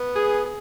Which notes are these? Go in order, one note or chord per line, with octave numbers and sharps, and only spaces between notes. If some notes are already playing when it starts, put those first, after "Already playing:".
Already playing: B3
G#4
G#4